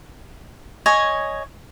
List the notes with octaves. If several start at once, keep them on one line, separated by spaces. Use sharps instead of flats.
C#5 D#5 G#5